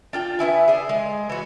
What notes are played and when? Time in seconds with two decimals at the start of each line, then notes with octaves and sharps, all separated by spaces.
0.13 D4 F4 G5
0.39 B3 C#4 E4 G#5
0.68 D4 G#4
0.89 G#3
1.30 E3 F#4